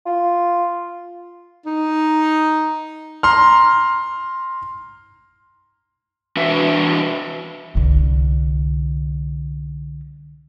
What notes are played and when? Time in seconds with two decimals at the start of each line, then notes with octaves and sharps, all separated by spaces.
0.06 F4
1.66 D#4
3.23 A#5 C6 F6
6.36 E3 D4 F#4 B4 E5
7.75 C2 D3